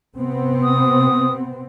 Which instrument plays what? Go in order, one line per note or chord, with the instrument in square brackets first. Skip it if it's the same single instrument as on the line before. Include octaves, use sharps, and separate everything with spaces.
[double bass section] C3 B3 C4
[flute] D#6